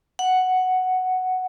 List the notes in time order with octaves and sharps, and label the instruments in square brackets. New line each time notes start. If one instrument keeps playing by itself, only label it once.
[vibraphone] F#5